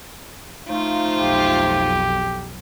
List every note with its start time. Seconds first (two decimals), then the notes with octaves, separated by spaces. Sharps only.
0.69 F3 A3 D#4 F4
1.17 B1 F2 G4